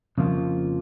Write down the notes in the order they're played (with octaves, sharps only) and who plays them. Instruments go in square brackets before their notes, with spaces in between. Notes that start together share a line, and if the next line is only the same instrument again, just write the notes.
[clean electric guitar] F2 C#3 F3 A#3 F4